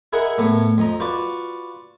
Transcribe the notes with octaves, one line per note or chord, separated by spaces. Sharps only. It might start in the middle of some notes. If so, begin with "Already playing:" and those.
E4 G#4 A#4 D#5 E5 F#5
A2 A3 B3
F2 D#5 A#5
F4 F#4 B4 D5